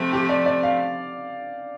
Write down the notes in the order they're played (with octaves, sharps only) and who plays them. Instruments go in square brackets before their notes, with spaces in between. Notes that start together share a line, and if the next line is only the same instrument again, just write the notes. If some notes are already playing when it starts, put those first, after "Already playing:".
Already playing: [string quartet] C3 F3 A3
[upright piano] G4
D5
D5
F5